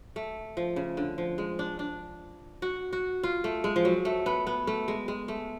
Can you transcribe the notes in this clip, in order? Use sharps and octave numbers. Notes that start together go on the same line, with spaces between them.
A3
F3
C#3
D3
F3
G#3
D4
D4
F#4
F#4
F4
A3
G#3
F3
F#3
A3
B3
B3
A3
G#3
G#3
A3